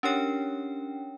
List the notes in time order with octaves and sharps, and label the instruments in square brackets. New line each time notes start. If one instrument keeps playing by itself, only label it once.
[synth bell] C#4 D4 G4 A#4 C#5 G5